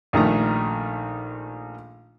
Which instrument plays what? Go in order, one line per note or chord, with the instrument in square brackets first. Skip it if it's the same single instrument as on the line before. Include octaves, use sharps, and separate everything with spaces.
[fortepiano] A#1 D#3 A3 A#5